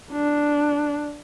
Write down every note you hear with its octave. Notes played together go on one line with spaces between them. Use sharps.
D4